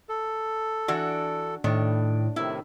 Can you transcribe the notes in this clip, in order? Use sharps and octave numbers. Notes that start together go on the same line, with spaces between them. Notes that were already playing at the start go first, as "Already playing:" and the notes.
A4
E3 D4 F#4
A2 D#3 D4
A2 C3 D#3 E4